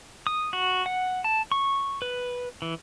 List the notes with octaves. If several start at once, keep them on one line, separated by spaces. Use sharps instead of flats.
D#6
F#4
F#5
A5
C#6
B4
E3